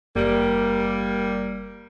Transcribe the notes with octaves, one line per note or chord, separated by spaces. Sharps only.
F#1 G3 A#3